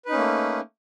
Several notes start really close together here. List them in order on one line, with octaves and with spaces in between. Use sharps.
B4 D#4 C#4 A#3 A3